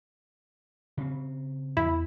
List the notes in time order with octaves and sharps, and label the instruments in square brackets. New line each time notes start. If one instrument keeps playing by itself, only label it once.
[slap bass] C#3 C4
[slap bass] E2 [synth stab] E4